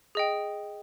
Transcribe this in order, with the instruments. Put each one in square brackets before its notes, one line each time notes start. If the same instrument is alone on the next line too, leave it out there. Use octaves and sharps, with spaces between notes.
[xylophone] G#4 D#5 G5